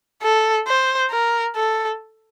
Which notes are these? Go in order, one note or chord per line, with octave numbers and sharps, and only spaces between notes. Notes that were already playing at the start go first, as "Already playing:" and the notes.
A4
C5
A#4
A4